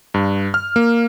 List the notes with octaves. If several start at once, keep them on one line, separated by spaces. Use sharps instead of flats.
G2
F6
A#3